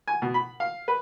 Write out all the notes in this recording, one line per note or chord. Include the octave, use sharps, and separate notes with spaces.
G#5
B2
B5
F5
B4